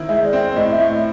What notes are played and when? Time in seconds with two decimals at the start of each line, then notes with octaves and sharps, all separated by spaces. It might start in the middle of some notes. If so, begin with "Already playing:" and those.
Already playing: D#3 C4 E4
0.09 G#3 E5
0.25 D5
0.33 C4
0.56 A2 D#5
0.72 E5
0.80 A2